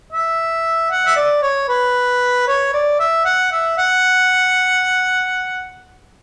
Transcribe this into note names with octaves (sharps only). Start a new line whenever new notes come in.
E5
F#5
E5
D5
C#5
B4
C#5
D5
E5
F#5
E5
F#5